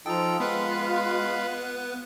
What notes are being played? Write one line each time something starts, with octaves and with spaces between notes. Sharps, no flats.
F3 D#4 F4 A4 G5 A#5
G#3 B3 B4 F5 B5 F#6